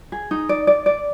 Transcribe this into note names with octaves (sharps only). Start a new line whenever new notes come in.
G#4
D#4
D5
D5
D5